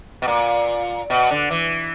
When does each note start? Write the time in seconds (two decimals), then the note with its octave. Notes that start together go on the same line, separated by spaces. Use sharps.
0.22 B2
0.28 A#2
1.10 B2
1.30 D3
1.51 E3